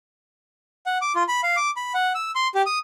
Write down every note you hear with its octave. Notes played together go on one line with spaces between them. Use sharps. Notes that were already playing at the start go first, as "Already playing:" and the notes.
F#5
D6
F4
B5
F5
D6
B5
F#5
E6
C6
G4
D#6